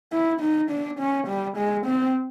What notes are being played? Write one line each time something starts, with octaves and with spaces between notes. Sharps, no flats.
E4
D#4
D4
C#4
G3
G#3
C4